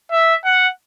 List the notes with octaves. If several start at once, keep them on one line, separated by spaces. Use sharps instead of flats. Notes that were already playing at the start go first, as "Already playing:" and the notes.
E5
F#5